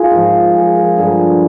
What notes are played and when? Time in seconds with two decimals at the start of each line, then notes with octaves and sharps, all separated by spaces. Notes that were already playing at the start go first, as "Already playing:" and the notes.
Already playing: F4 G#4
0.10 G#2 F3 A#4
0.55 G#4
0.76 A#4
0.96 G2 D3 F3 G#4